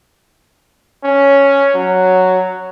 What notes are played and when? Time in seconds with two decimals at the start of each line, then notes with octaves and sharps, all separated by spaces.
1.04 C#4
1.75 F#3